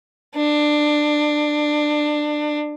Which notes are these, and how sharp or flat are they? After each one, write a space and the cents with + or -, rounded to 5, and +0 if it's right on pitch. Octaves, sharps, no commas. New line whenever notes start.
D4 +20